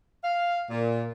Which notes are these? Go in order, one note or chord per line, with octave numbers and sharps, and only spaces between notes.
F5
A#2